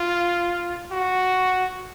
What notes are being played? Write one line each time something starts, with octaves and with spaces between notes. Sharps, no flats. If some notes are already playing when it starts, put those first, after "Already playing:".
Already playing: F4
F#4